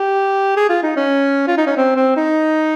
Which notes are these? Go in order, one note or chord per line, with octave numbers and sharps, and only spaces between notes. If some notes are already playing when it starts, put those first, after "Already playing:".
Already playing: G4
G#4
F4
D#4
C#4
F4
D#4
C#4
C4
C4
D#4